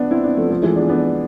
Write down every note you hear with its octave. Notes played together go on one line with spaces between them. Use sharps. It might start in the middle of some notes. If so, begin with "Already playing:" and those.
Already playing: B3 D4
C4 E4
B3 D4
F3 A3
F3 A3
E3 G#3
B3 D4
B3 D4